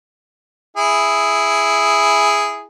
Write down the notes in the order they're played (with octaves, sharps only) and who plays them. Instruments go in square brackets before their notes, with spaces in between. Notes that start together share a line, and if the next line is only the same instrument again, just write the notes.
[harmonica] E4 G#4